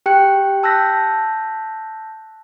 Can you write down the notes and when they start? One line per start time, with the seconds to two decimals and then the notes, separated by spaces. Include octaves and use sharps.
0.06 G4 G5 F#6 C#7
0.63 A5 E6 F#6 G6 A#6 B6